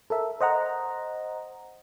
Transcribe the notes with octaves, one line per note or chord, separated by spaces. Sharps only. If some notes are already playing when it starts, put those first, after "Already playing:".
A4 A#4 E5
C5 D#5 F#5 A#5